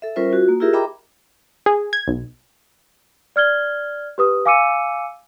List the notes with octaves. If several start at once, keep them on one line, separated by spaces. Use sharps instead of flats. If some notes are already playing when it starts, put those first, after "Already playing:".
A4 E5
G3 C#4 F4 A#4 C5 E5
F4 F#4
A#3
E4 F4 G4 G#4 A#4 E5
D#5 E5 G5 A#5 B5 D6
G#4
G#6
B1
D5 F6 G#6 G7
G4 B4 D#6
F5 G#5 D6 E6 C#7 D#7